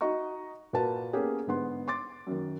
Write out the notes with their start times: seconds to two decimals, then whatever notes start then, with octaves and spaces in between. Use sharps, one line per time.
0.01 D#4 F#4 D#5 A#5 C#6
0.73 A#2 A#3 F#4 B4 A5
1.13 A#3 B3 C#4 G4 G#4
1.47 G#2 D3 B3 C6
1.88 C6 D6 A6
2.27 F#2 D#3